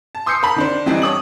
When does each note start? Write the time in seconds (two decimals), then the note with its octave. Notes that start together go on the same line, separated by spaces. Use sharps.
0.15 A5
0.26 C6 D#6 E6 G6 C7 C#7
0.43 A#4 B5
0.56 D#3 D4 C5
0.86 E3 G3 C4 D4 D#4
1.02 C#5 D#6 F#7